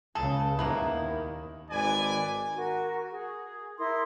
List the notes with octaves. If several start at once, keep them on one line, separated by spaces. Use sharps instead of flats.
C#2 C#3 G#4 A4
D#2 D#3 A#3 B3 E4
G#1 B4 D5 G#5
F#4 A#4
G#4
E4 A#4 C6 D#6